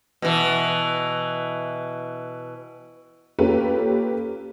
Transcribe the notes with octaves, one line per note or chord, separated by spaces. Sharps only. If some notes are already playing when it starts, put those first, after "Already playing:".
B2 E3
A#3 C#4 F4 G4 A4 B4